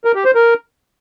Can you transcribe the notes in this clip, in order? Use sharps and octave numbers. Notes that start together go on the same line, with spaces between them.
A#4
G4
C5
A#4